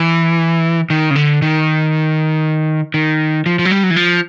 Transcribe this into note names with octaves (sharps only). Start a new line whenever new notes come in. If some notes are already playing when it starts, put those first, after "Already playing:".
Already playing: E3
D#3
C#3
D3
D#3
D#3
F3
F3
F#3
G3
F#3
E3
F3